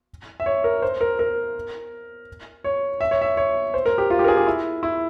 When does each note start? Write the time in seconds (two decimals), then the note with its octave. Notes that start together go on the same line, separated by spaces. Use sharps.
0.40 E5
0.46 C#5
0.64 A#4
0.82 C5
1.01 A#4
1.19 A#4
2.64 C#5
3.01 E5
3.11 C#5
3.21 E5
3.37 C#5
3.74 C5
3.86 A#4
3.98 G4
4.10 F4
4.19 G4
4.24 A#4
4.28 G#4
4.37 G4
4.47 E4
4.83 E4